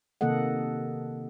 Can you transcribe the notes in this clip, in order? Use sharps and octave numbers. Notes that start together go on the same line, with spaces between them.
C3 D#3 A#3 A4 D#5 F#5